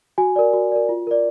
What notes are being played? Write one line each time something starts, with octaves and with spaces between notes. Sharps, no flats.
F#4 G#5
A#4 D5
F#4
A#4 D5
F4
A#4 D5